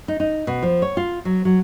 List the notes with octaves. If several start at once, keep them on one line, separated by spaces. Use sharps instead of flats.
D#4
D#4
B2
F3
C#5
F4
F#3
F#3